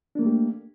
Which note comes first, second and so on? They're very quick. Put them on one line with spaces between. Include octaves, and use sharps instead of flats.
D4 A#3 A3 G4